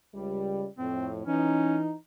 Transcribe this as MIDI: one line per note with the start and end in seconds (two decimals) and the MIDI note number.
0.14 0.65 37
0.14 0.65 55
0.79 1.23 41
0.79 1.23 45
0.79 1.08 60
1.27 1.93 52
1.27 1.76 61
1.27 1.93 63